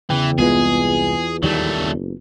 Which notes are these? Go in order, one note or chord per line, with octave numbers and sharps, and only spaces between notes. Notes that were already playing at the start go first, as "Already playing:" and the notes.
E2 C#3 E3 G5
C2 G#3 B3 F4 G#4 B4
D#2 D#3 F#3 G3 A3
F#1